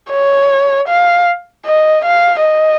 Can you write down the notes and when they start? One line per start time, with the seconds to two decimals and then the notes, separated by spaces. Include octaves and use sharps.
0.11 C#5
0.88 F5
1.66 D#5
2.05 F5
2.44 D#5